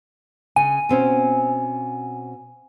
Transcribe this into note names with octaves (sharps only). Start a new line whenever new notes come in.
C#3 G#5
B2 C4 C#4